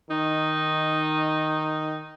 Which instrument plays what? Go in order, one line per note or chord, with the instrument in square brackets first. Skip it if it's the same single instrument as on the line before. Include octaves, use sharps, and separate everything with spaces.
[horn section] D#3 D#4